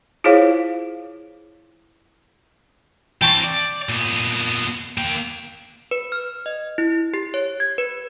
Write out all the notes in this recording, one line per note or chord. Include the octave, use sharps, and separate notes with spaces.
E4 F4 G#4 C5 C#5 F5
E3 C4 G5 A5 C#6
D5
A#2 B3
A#3 G5
B4
F6
D#5
E4
G4
C#5
G#6
B4